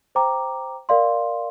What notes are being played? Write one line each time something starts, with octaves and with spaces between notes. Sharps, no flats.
C5 G5 A#5 D6
A#4 D5 F5 C6